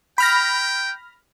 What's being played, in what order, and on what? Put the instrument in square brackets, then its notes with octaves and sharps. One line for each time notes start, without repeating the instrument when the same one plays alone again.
[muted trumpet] G5 [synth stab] B5 F6 A#6